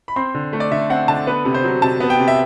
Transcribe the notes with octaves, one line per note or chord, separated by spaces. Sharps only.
B5
C4 C6
D3
A3
D5
D3 E5
C4 F#5
D3 A5
B3 B4
C3
C5
F#3
C3 A5
B3
G5
C3
E5